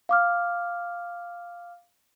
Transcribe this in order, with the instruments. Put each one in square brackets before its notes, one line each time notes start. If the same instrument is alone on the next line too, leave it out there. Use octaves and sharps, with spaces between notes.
[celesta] F5 D6 F6